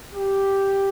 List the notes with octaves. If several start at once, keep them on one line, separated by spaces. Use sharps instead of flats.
G4